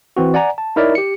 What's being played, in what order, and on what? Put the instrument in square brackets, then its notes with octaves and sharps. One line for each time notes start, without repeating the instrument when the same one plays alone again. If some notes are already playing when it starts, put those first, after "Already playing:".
[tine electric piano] E3 C4 F#4
D5 F#5 G#5 A#5
A5
D#4 E4 A#4 C#5 D5 E5
G4 C#7